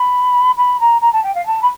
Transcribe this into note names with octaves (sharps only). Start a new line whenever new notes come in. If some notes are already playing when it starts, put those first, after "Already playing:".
Already playing: B5
B5
A#5
A#5
A5
G5
F5
A5
B5